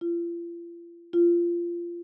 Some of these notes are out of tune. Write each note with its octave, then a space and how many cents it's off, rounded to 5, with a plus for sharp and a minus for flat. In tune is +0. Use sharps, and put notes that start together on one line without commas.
F4 -40
F4 -20